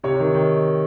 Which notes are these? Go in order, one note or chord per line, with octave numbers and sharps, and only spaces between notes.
C3 C#5
D#3
D#3